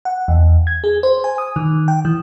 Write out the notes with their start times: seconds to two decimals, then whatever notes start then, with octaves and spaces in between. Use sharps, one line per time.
0.05 F#5
0.28 E2
0.67 G#6
0.84 G#4
1.03 C5
1.24 G#5
1.38 D#6
1.56 D#3
1.88 G5
2.05 E3